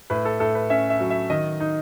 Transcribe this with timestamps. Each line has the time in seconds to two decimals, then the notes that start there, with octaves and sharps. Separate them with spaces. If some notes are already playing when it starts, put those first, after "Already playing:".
0.10 A2 B4
0.25 A4
0.40 A2 A4
0.55 B4
0.70 C#4 E5
0.90 E5
1.00 F#3
1.10 E5
1.30 D#3 D#5
1.60 D#4